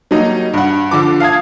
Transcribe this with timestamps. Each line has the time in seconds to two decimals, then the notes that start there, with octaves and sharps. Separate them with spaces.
0.11 F#3 G3 A#3 D#4
0.54 G2 F#5
0.91 D3 F3 D6
1.20 F5 A5 D#6 G#6